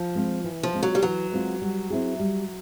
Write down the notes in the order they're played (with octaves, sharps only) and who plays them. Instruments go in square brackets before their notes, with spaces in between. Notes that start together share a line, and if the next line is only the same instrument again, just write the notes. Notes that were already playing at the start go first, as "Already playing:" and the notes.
Already playing: [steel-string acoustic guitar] F3
[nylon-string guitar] G#3 C4 F4
E3
[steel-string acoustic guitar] F3
[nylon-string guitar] G#3 C4 F4
[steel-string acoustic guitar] F#3
G3
[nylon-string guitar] E3 [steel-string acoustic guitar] F#3
[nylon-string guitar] G#3 C4 F4
G3
C4 E4 G#4
G3